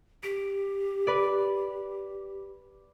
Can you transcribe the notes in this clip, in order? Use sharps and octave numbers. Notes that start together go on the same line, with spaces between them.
G4 D7
B4 D5